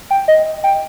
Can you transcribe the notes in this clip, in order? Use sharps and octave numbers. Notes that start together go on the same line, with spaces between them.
G5
D#5
G5